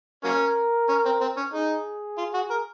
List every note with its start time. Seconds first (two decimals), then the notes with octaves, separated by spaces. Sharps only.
0.24 F#3 A#3 C#4 A#4
0.89 C#4
1.05 C4
1.21 C4
1.37 C#4
1.53 D#4 G#4
2.18 F4
2.34 F#4
2.51 A#4